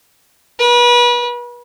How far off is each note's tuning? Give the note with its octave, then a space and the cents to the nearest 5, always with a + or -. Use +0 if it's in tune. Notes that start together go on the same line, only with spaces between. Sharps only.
B4 -35